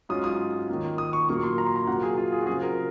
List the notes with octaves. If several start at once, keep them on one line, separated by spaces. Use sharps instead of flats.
G#2 F#3 C#4 F4 D#6
D#6
D#3 A#3 F4
D#6
C#6
A#2 F#3 A#3 F4 C#6
C6
A#5
C6
A#5
C3 F#3 A#3 F4 F#5
G#4
F4
G#4
F#4
C#3 F#3 C4 F4 G#4
A#4